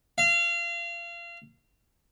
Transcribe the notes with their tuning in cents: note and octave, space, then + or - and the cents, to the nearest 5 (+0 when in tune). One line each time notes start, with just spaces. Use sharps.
F5 -30